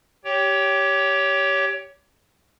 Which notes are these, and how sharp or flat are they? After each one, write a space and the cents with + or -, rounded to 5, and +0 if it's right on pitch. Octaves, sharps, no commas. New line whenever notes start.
G4 -5 C#5 +20 G5 +0